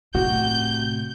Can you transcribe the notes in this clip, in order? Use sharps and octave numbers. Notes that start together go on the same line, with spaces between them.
A2 C3 F#4 G6